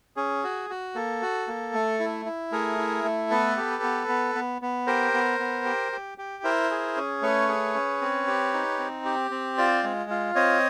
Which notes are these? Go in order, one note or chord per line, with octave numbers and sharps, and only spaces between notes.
C#4 G#4
F#4
F#4
A#3 A4
F#4
A#3
A3
E4
E4
A3 G#4 A#4
E4
A3
B3 A4 B4
G4
B3
B3
B3
B3
G4 A#4 C5
B3
B3
G4
G4
G4
E4 A#4 C5
G#4
C#4
A3 B4 C#5
G#4
C#4
C4
G4
D#4
C4
G4
C4
F4 C5 D5
G#3
F4
C4 C#5 D#5